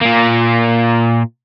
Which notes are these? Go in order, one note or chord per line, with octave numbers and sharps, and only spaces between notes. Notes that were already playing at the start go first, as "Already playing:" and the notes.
A#2 A#3